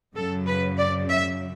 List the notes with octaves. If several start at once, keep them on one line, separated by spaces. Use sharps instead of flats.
F#2 C#3 F#3 A4
B4
D5
E5